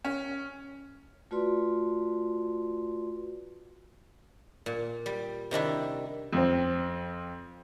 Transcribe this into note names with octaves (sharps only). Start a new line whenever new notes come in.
C#4
A3 F4 F#4 B4 D5 C6
A#2
G3
C3 D#3 D4 E4
F2 C4